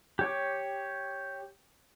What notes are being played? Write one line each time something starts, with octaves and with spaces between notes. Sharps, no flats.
G4 C#5 D6